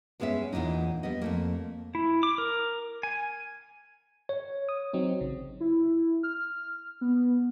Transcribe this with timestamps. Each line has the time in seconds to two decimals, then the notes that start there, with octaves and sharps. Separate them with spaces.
0.20 G2 G#3 B3 C#4 E5
0.53 E2 A#2 C#3 D4 D#4
1.03 G3 B3 D#5
1.21 F2 A3 A#3
1.95 E4
2.23 D6
2.38 A#4
3.03 G#5
4.29 C#5
4.69 D#6
4.93 F#3 C4 D#4
5.21 A1 C#3
5.60 E4
6.23 F6
7.01 B3